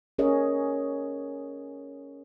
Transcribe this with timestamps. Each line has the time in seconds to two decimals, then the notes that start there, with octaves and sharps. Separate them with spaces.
0.18 C#4 G#4 A#4 C#5 D#5